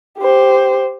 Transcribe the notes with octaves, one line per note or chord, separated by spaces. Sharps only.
G4 C5